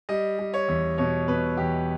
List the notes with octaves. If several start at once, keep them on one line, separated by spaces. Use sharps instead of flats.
G3 D#5
G3
C#5
E2
B2 C#5
B2 B4
E2 G4